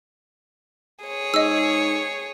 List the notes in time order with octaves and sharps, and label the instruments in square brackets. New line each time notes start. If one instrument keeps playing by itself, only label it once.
[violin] G#4 C#5
[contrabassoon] G#2 [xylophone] D#5 E6